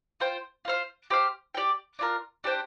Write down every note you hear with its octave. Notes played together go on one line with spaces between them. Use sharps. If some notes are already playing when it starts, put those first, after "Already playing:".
F4 C5 G5
F4 C5 F5
G4 C5 F5
G4 D5 G5
D4 F4 A#4
D4 G4 C5 G5